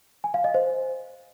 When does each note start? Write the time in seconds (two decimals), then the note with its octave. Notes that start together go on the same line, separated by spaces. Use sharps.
0.24 G#5
0.34 F5
0.44 D#5
0.54 C5